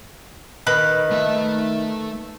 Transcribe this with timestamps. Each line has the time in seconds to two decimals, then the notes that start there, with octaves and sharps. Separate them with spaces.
0.67 D#3 B4
1.11 A3 E5